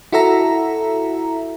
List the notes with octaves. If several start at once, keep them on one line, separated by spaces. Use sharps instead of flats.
E4 F#4 A4 E5 A#5